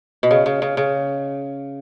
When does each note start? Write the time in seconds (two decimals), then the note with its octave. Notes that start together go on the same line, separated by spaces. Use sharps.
0.23 B2
0.31 C#3
0.46 C#3
0.62 C#3
0.77 C#3